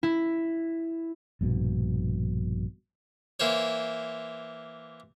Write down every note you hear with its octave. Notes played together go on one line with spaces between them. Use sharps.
E4
A#1 G2 B2
E3 A#3 C5 C#5